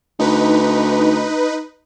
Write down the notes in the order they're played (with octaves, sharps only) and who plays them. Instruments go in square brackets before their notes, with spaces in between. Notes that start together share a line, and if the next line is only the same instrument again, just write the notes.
[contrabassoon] D2 [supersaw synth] D#4 B4